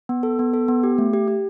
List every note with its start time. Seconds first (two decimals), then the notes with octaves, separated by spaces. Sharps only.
0.09 B3
0.23 A4
0.39 B3
0.54 A4
0.68 B3
0.83 G4
0.98 A3
1.13 G4
1.28 G4